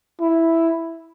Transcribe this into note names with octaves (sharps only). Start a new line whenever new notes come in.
E4